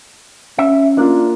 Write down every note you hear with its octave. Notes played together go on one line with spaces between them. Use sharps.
C#4 E5
A#3 D4 F4